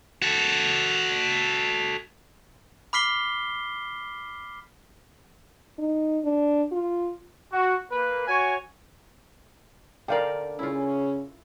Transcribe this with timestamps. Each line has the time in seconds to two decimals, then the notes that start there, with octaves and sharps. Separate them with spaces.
0.22 F#4 A4
2.93 B5 D6 F6 B6 C7 G7
5.78 D#4
6.24 D4
6.72 F4
7.52 F#4
7.90 A#3 B4
8.27 F#4 C#5 G#5
10.08 D3 A#4 D5 F5 G5
10.59 C#3 C#4 E4 F4